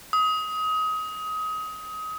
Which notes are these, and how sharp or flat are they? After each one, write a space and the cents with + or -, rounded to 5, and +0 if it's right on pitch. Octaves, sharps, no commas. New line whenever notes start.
D#6 +25